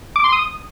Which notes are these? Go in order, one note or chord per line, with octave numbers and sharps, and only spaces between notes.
D6
C6
D#6